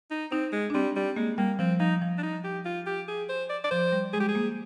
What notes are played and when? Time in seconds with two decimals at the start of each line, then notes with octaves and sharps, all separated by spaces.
0.11 D#4
0.32 C4 D#4
0.53 G#3
0.70 D4
0.74 G3 C4
0.96 G3
1.16 G#3 A#3
1.38 G3 A#3
1.59 F3 C4
1.80 F3 D#4
2.01 F3
2.18 D4
2.23 D#4
2.44 G4
2.65 F4
2.86 G4
3.08 G#4
3.29 C5
3.50 D5
3.64 D5
3.71 F3 C5
3.92 G3
4.13 G#3 G#4
4.20 G4
4.28 G#4
4.35 A#3